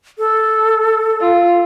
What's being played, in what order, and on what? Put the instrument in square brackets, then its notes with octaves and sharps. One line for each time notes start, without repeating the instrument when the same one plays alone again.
[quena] A4
[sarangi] F4